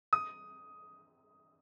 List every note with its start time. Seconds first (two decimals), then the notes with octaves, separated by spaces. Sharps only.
0.13 D#6